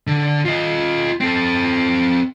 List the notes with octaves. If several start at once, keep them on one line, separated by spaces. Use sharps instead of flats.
D3
F4 D#5
C4 A4